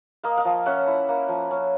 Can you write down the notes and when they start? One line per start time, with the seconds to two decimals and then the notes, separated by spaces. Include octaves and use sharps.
0.24 A#3 D#5 F5
0.37 D#5 F5
0.45 F3
0.66 C#4 E5 F#5
0.87 E4
1.09 A#3
1.29 F3
1.51 C#4